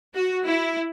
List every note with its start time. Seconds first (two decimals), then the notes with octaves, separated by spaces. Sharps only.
0.15 F#4
0.47 E4